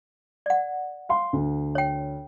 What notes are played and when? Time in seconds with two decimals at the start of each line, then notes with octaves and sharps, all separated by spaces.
0.46 D5 F#5
1.09 F5 C6
1.33 D2
1.75 C#5 G5